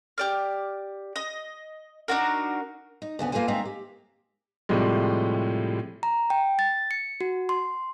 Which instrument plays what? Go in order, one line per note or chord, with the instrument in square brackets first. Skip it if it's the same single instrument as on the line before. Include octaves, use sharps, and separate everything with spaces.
[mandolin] G4 D5 F6
D#5
D4 D#4 F#4 A#4
[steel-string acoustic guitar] D#4
D2 C#3 B3 F#4
A#3 F4 A4 B4 C5 G#5
D#3 G#3 C4 E5 F5 A#5
G4
[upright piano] A2 C3 F3 G3 G#3
[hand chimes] A#5
G5
A6
C#7
F#4
C6